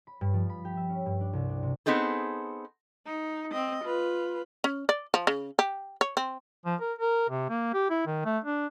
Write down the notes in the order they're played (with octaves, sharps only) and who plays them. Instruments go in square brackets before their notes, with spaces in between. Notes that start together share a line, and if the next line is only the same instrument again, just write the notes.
[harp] B5
G2
F3
B5
G4
E5
C#4
G2
D4
C2
D4
C3
[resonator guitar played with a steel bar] B3 C4 D#4 G#4 A4
[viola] D#4
C4 D#5
F4 B4
[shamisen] C#4
D5
F3
C#3
G4
C#5
C4
[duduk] F3
A#4
A#4
C3
A#3
G4
E4
D#3
A3
D4